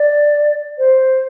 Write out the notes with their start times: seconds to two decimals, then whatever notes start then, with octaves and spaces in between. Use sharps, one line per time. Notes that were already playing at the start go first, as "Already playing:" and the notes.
Already playing: D5
0.78 C5